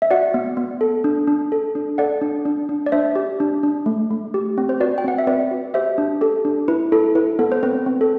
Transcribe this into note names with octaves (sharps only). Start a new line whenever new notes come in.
E5
F#4 D5 F#5
B3
B3
A4
D4
D4
A4
D4
A4 D5 F#5
D4
D4
D4
D5
D4 C5 E5
G4
D4
D4
A3
A3
G4
C4
C5
F#4 B4 D5
G5
C4 F#5
E5
C4 B4 D5
F#4
G4 C5 E5
D4
G4 A4
D4
E4 B4
E4 A4
E4 B4
B3 A4
C5
C4 B4
C4
A4